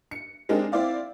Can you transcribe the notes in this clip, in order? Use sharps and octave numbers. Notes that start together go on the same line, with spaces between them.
C#7
G#3 C4 D4 D#4 A#4
C4 E4 D5 F5